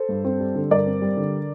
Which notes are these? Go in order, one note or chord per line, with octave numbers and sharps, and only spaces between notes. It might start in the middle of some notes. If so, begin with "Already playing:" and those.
Already playing: A4 C5
G2
C4
G3
D3
G2 A#4 D5
C4
G3
D3